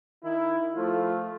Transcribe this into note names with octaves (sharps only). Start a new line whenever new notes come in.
D#3 E4
F3 A3 F4